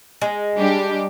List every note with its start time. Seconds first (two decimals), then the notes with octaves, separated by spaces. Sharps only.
0.22 G#3
0.56 G3 D4 G4